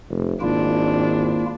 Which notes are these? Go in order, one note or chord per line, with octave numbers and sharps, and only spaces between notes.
F1
G#1 A#3 D4 E4 F4